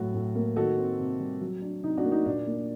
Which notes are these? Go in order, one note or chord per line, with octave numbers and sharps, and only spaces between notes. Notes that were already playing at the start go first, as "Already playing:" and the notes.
Already playing: A2 F#3 F#4 A4
A2
A#3
D#3 F#4 A4
C4
C3
G3
F#3
D4
C3 D#4
D4 F#4
A#3
D#4
A#2 D4
A#3